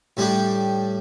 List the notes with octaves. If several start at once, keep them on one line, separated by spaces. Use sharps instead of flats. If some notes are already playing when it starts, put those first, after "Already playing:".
A2 G3 D4 G4